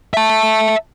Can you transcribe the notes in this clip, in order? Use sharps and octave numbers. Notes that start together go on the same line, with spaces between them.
E5 A5